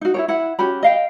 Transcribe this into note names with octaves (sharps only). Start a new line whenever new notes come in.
D#4 F#4
E4 G#4 C#5
E4 F#5
C#4 F#4 G4 B5
D#5 F5 G5